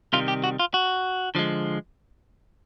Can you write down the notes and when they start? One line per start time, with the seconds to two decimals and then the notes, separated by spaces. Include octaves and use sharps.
0.13 C3 D#3 G3 F4
0.28 G4
0.44 F#4
0.59 F4
0.74 F#4
1.35 D3 F3 G#3